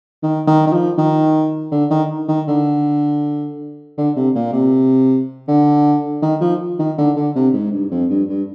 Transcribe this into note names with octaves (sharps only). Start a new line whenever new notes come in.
D#3
D#3
D#3
F3
D#3
D3
D#3
D#3
D3
D3
C3
A#2
C3
D3
D#3
F3
D#3
D3
D3
C3
G#2
G2
F2
G2
G2